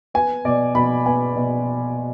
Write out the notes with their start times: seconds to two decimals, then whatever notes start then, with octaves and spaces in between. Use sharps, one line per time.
0.14 B3 G#5
0.45 B2 D5
0.75 B2 B5
1.06 B3 G#5
1.36 B2